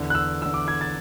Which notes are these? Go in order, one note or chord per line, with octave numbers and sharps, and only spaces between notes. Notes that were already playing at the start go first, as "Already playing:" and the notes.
Already playing: E2 D3
F#6
E6
E2 D3 E6
D6
G#6
A6